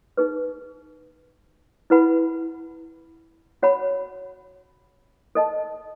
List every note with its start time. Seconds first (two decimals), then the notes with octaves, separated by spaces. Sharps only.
0.17 D#4 G#4 B4
1.90 E4 B4 F#5 B5
3.62 F#4 C#5 F#5 B5
5.35 A4 D#5 A5